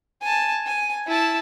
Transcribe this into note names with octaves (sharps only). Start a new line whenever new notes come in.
G#5 A5
G#5
E4 A5